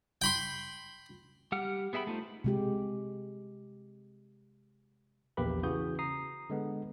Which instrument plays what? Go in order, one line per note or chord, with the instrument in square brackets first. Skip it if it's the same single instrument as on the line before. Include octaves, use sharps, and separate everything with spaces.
[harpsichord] G5 B5 C6
[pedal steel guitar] G3 G4 F#5 F6
B3 G#4 E5 G5 B5
A3 D#4 F4 C5
[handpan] C3 G#3 G4
[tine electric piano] A#1 E2 A#3 G4 B4 B5
C#3 E3 F#4 D#6 G6
A#5 D#6 C7
D3 G#3 B3